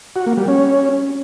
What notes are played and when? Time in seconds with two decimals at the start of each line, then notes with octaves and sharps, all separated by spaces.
0.16 F#4
0.26 A#3
0.37 G3
0.48 C#4